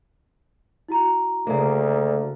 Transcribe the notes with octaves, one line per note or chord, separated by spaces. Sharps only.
E4 F#4 A#5
D2 C#3 A#3